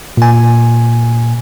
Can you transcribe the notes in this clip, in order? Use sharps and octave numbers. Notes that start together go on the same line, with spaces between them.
A#2 G#5